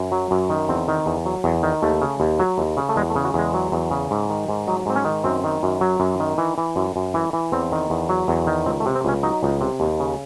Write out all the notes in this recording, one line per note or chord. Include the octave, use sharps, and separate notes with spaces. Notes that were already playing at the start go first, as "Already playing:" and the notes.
Already playing: F#2
F#3
F#2
D#3
E2 C4
D#3
E2
F#3
E2
D#3
D#2 A3
C#3
D#2
F#3
D#2
C#3
A3
E2 G#3
A3
C#3
F#4
E2 G#3
F#3
E2
C#3
G#2
D#3
G#2
F#3 D#4
G#2 C4
C#4
D#3
F#2 C4
D#3
F#2
F#3
F#2
D#3
E3
E3
F#2
F#2
E3
E3
E2 C4
D#3
E2
F#3
E2
D#3
C#2 C4
A3
C3
C4
C#2 C#4
F#3 D#4
C#2
C3
D#2
C#3